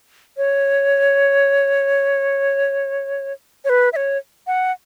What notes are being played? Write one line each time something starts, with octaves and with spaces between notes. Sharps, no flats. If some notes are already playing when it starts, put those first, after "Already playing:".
C#5
C#5
B4
E5
C#5
F#5